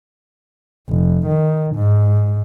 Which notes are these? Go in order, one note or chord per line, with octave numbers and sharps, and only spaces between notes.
F1
D#3
G#2